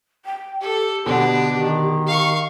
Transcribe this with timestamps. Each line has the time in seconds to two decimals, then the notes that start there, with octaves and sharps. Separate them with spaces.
0.25 G5
0.61 G4 A4
1.06 B2 D3 B3 D4
1.52 D#3
2.07 F5 C#6